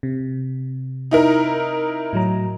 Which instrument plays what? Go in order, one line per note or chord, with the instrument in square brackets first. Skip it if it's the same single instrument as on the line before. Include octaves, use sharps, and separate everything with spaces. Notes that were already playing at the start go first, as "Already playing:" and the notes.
[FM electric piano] C3
[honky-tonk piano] D#4 E4 A#4
[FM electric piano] A2 F#3 A#5